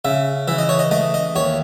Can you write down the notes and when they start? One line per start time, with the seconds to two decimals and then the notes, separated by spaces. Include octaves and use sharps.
0.05 C#3 E5
0.48 E3 E5
0.58 D#5
0.69 C#5
0.79 D#5
0.91 A3 D#5
1.14 D#5
1.36 D#2 C#5